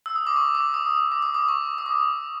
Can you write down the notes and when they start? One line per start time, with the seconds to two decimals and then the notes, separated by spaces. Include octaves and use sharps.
0.06 E6
0.16 D#6
0.27 D6
0.36 C#6
0.55 D6
0.74 D#6
1.12 D6
1.23 D#6
1.34 D6
1.49 C#6
1.78 D#6
1.86 D6